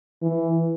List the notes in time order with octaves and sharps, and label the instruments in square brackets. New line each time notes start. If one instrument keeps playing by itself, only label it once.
[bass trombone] E3